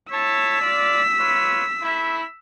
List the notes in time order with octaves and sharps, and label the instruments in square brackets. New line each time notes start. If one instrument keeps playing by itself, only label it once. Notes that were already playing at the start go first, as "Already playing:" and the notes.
[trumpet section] E4 C#5 A5 [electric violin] E6 B6
[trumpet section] F4 D5
F4 B4 C#5
A3 E4